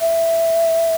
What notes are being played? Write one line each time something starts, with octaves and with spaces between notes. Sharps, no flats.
E5